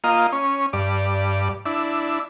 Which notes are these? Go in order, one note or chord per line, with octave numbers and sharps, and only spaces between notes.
A#3 F4 D#5
C#4
G2 D5
D4 E4